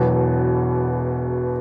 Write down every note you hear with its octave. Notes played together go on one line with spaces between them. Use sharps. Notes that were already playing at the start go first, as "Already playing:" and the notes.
Already playing: E1 E2 B2 F#3